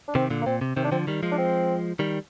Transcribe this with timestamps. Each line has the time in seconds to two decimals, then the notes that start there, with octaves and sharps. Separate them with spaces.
0.08 D4
0.15 C3 D#3 C4
0.30 A#2 D3
0.41 A#3
0.46 A#2 C4
0.61 C3
0.76 C3 D#3 C4
0.84 D4
0.91 D3 F3 C4
1.07 D#3 G3
1.23 F3 G#3
1.31 D4
1.38 C4
1.99 D#3 G3